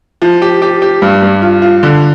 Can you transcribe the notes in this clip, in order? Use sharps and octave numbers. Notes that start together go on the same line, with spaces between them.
F3
G4
G4
G4
G2
G2
F4
F4
D3